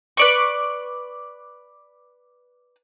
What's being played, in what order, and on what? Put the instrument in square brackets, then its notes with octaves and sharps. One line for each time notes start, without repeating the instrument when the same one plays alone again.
[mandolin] B4 D5 C#6